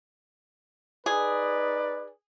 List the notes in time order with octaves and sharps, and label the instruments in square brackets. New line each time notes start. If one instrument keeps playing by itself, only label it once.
[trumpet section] D#4 B4 D5 [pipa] G#4